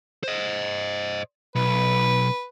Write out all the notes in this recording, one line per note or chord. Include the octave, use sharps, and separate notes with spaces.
C5 D#5
B1 B4